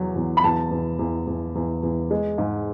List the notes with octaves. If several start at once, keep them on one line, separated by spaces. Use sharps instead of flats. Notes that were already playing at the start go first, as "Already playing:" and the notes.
Already playing: E2 F#3
E2
B5
E2 A5
E2
E2
E2
E2
E2
G#3
G#2